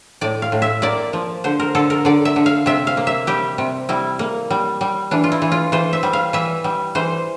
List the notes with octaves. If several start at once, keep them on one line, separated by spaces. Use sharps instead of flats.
A2 D5
F5
A2
E5
A#3 D5
F3
D3 C5
A#4
D3 A4
A#4
D3 D5
E5
D3
F5
C3 E5
F5
A#3
E5
G3 G4
C3
G3 E4
A#3
G3
G3
E3 D4
F4
E4
E3
F4
E3 C5
E5
G3
F5
E3 E5
G3
E3 C5